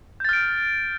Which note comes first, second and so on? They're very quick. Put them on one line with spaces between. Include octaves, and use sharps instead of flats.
G6 A6 F6 D7